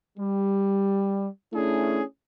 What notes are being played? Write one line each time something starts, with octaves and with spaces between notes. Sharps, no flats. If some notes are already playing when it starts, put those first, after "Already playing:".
G3
A3 C#4 D4 E4 G#4